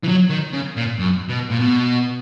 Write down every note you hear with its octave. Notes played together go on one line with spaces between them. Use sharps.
E3
F#3
D#3
C#3
A#2
F#2
B2
A#2
B2